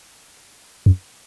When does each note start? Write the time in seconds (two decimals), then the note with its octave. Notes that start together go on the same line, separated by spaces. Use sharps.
0.86 F#2